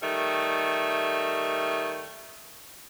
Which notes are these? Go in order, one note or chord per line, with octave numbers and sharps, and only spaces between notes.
D#3 G3 A3